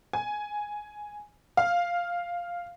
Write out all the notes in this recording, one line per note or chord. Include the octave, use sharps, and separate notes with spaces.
G#5
F5